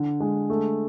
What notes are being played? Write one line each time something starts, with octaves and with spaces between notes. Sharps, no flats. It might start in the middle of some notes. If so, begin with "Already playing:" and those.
Already playing: D3
G#3
A3